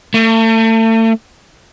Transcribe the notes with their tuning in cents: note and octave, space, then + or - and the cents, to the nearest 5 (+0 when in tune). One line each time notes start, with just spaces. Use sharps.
A3 +35